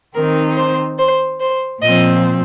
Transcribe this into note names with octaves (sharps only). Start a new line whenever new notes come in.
D#3 C4 D#4 A#4
C5
C5
C5
A#2 F3 C4 D#5